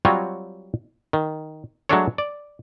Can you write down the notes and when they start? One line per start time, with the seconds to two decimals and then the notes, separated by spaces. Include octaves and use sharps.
0.05 F#3 G3 C4 F4 F#4 C#5
1.13 D#3
1.89 F#3 G#3 A3 D4 A4 C#5
2.18 D5